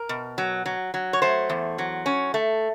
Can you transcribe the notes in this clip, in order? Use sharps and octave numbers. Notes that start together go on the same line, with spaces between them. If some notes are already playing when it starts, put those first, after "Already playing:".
Already playing: A#4
B2
F#3
F#3
F#3
C#5
A3 C5
E2
F#3
C#4
A3